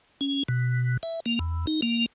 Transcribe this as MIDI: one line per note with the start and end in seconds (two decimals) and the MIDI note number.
0.21 0.43 61
0.48 0.97 47
1.03 1.20 76
1.26 1.39 58
1.39 1.66 40
1.67 1.81 63
1.82 2.06 58